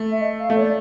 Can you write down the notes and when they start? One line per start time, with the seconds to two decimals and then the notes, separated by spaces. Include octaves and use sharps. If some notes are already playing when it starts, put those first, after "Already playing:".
Already playing: A3
0.11 E5
0.21 D#5
0.40 F5
0.49 A3 E5
0.56 C#5
0.61 D5